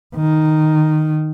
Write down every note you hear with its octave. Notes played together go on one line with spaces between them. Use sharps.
D#3